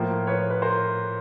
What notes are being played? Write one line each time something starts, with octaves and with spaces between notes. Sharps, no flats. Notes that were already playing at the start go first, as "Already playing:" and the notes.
Already playing: A2 F3 A#3
B4 C#5
B4
A#4 C5